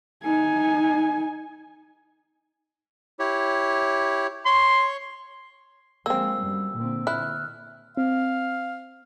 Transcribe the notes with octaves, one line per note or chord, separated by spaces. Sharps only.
D#4 G#5
E4 G4 C#5
C#5 C6 C#6
F3 G#3 A#3 C4 E6
F#2 G3
A#2 D3 C4
D3 E4 F6 F#6
C4 F5